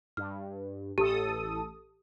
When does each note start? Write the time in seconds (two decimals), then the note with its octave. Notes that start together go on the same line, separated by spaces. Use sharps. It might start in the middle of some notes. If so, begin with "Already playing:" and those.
0.17 G2 F6
0.98 A1 G4 A4 D#6